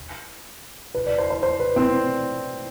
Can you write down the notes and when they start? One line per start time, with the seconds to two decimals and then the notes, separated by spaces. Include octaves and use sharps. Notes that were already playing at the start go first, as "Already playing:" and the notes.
0.95 B4
1.06 D5
1.18 C5
1.30 C5
1.43 C5
1.60 B4
1.76 C4